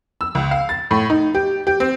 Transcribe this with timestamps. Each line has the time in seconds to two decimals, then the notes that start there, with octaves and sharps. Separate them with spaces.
0.21 E6
0.35 C#2
0.51 F5
0.69 A6
0.91 A2
1.10 D#4
1.35 G4
1.67 G4
1.80 C4